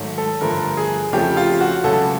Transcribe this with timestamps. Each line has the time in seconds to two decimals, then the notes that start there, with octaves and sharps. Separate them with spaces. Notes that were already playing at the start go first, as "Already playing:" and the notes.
Already playing: G#2 D#3 F#3 A3
0.18 A4
0.41 G2 D3 F3 A3 A#4
0.77 G#4
1.13 F2 C#3 F3 A3 G4
1.37 F4
1.60 F#4
1.84 C#2 C#3 F#3 A3 A4